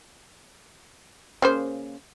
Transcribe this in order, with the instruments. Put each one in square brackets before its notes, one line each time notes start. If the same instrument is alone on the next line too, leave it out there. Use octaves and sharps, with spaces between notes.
[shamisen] C#3 A#3 C5